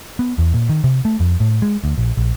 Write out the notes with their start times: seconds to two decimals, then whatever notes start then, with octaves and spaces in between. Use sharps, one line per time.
0.19 B3
0.38 E2
0.54 A#2
0.69 D#3
0.84 C3
1.05 A3
1.20 F2
1.40 A2
1.62 G#3
1.84 D2
1.98 A#1
2.17 A#1